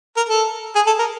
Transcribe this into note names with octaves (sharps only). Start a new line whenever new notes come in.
A#4
A4
G#4
A4
A#4